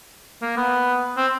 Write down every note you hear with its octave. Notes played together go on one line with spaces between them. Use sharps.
A#3
B3
C4